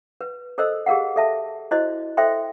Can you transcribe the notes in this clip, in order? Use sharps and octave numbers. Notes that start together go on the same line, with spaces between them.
B4
A4 A#4 C5 D#5 E6
G4 G#4 A#4 F5 F#5
A4 E5 A5
E4 F#4 C5 D#5
A4 C5 E5 G5 C6